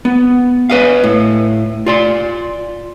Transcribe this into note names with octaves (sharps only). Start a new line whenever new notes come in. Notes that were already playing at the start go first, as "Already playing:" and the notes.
B3
B4 D#5 F5
A2
F4 D5 C6